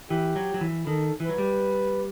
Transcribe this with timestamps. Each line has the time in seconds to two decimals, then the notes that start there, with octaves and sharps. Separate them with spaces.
0.10 E3 G4
0.36 F#3
0.54 F#3
0.61 E3
0.87 D#3 A4
1.20 E3
1.25 F#3 B4
1.38 G3